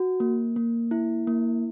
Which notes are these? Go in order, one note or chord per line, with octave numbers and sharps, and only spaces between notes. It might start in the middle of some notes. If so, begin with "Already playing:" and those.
Already playing: F#4
A#3
A#3
E4
A#3